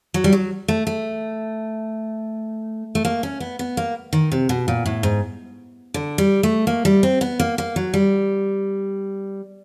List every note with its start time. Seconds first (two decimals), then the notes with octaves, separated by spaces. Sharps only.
0.14 F#3
0.24 G3
0.33 F#3
0.68 A3
0.87 A3
2.95 A3
3.05 A#3
3.23 C#4
3.40 B3
3.59 B3
3.77 A#3
4.13 D#3
4.32 C3
4.49 B2
4.68 A#2
4.86 A2
5.03 G#2
5.94 D3
6.18 G3
6.43 A3
6.67 A#3
6.85 G3
7.03 C4
7.21 B3
7.40 A#3
7.58 A#3
7.76 F#3
7.94 G3